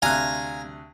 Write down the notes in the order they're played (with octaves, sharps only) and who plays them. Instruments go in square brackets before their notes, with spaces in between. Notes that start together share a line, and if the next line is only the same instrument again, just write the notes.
[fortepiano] D2 C3 F#6 [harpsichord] F5 G#5 A#5